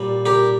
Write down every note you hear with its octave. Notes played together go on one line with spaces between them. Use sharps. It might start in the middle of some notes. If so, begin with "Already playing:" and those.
Already playing: A#2 G3
G4 A#4